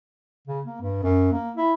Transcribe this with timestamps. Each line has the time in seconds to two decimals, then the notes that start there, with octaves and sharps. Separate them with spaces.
0.47 C#3
0.65 A#3
0.81 G2
1.03 F#2
1.32 A#3
1.56 E4